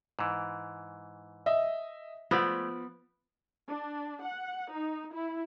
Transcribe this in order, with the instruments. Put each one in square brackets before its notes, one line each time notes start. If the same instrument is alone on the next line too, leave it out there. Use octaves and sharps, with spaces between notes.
[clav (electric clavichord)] G#2 E3
[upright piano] D#5 E5
[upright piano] F3 [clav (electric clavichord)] G#3 A3 D5 [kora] B3
[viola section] D4
F#5
D#4
E4